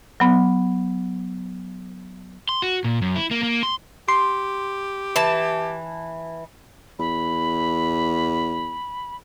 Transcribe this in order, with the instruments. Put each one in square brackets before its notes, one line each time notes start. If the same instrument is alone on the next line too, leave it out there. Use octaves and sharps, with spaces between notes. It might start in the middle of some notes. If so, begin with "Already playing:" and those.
[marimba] F#3 B3
[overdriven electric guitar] C6
F#4
A#2
F#2
E4
A#3
A#3
C6
[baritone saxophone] G4 [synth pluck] C6
[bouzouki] E3 A5
[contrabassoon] E2 [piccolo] B5